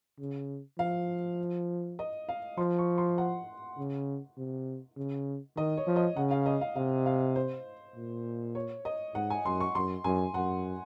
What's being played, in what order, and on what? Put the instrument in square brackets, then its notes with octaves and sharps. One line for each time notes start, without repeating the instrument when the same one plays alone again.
[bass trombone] C#3
[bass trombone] F3 [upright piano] F5
[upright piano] D#5
F5
[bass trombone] F3 [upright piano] C6
[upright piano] C#6
C6
F#5
[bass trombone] C#3
C3
C#3
[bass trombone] D#3 [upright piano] D#5
[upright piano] C#5
[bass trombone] F3
[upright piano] D#5
[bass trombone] C#3 [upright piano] F#5
[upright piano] F5
D#5
F5
[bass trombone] C3 [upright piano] F5
[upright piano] F5
C5
[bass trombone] A#2
[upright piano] C#5
D#5
[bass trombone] G#2 [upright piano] F#5
[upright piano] G#5
[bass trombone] F#2 [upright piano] C6
[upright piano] C#6
[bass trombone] F#2 [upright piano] C6
[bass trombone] F#2 [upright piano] G#5
[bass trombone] F#2 [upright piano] F#5